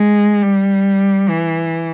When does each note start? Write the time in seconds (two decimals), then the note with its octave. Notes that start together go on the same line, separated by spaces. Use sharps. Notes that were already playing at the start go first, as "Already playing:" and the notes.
Already playing: G#3
0.42 G3
1.29 E3